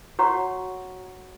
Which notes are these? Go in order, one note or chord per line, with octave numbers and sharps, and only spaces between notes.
F#4 C#5 F#5 A#5 C#6